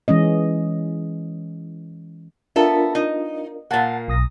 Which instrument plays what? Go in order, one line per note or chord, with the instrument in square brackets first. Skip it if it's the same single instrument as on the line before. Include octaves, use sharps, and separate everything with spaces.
[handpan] E3 G#3 C#4 D#5
[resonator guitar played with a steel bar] B3 A4 E5 [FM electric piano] D4 F4 A#4
[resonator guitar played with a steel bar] D#4
[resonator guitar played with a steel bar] A#2 A#3 [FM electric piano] F#5 A5 A6
[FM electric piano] B1 D#6 A#6